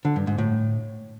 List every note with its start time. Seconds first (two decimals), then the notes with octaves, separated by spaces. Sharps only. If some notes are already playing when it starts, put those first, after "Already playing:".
0.05 D3
0.16 G2
0.27 G#2
0.38 A2